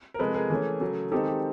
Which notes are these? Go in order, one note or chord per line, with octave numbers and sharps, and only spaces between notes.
A#4
C3 F3 G#3 A4 B4
G#4 A#4
E3 A3 C#4
C#3 F#3 A3
D#3 G#3 C4 D#4 G4 A4
G4